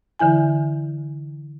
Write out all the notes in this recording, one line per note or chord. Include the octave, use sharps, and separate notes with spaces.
D3 E3 E4 G#5